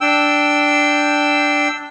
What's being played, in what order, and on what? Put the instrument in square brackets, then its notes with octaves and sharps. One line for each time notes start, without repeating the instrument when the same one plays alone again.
[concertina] D4 G5 E6